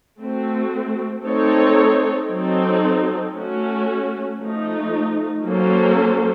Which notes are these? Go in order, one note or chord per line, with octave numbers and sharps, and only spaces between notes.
A3 C4 F#4
A3 C4 D#4 A4 C#5
F#3 C4 D#4 A4
A3 C#4 F#4
F3 A3 D#4
F#3 A#3 C#4 A4 C5